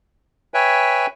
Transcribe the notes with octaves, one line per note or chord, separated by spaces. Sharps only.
B4 C#5 E5 G5 G#5